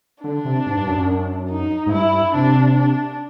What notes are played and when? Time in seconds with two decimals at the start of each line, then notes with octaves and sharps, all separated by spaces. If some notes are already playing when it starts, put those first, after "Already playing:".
0.24 D3 D4
0.45 C3
0.66 G#2
0.77 G2
0.87 F#2
0.97 F#2
1.50 D#4
1.86 G#2
1.92 G2 E4
2.34 C3 D4
2.76 D4